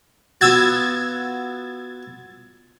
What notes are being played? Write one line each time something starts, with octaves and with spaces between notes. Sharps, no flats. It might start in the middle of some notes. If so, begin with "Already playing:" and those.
B3 F4 F#4 E6 G#6 A6